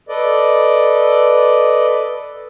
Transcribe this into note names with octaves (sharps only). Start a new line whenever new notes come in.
A4 B4 D5 D#5